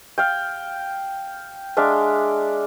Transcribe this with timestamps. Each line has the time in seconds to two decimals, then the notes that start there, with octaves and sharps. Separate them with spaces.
0.18 F5 G5
1.77 G#3 D4 E5 F5